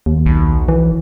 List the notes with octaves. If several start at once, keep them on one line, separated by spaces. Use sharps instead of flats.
D#2
B1
E3